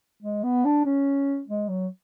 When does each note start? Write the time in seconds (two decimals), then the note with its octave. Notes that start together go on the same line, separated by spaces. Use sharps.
0.22 G#3
0.43 B3
0.65 D4
0.85 C#4
1.48 G#3
1.69 F#3